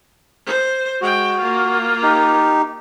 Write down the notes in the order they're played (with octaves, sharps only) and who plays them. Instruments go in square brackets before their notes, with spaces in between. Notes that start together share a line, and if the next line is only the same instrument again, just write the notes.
[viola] C5
[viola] G#3 G5 [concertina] F#4
[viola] A#3 F4
[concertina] D#4 G4